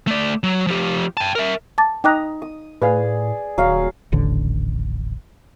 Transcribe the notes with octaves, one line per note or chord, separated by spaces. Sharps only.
A3 D5
F#3
F3 G4
G5 A5
A#4 E5
A5 D6 A6
D#4 D#5 G5 A#5 D6 F#6
D#6
A2 G#4 B4 D5 F5
D#1 F#3 F5
D#1 A1 D3